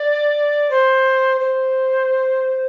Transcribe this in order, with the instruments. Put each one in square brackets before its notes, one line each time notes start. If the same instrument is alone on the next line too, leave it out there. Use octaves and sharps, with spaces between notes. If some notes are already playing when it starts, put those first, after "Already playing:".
Already playing: [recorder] D5
C5
C5